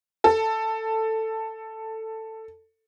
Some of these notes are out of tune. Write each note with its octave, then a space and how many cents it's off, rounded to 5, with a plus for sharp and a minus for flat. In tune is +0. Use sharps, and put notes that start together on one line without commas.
A4 +10